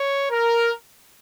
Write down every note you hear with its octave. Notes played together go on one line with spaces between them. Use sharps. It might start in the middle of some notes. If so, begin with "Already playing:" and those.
Already playing: C#5
A#4